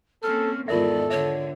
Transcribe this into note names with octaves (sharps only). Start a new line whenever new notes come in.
A#3 C4 C#4 A4 F6
E2 G#2 D#3 F4 A4 A#4 D5 E5
D3 C#5 E5